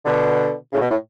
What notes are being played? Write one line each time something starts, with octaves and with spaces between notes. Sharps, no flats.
B2 D3
A2 C#3
B2
A2